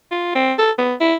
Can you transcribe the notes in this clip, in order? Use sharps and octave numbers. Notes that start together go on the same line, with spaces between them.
F4
C4
A4
B3
E4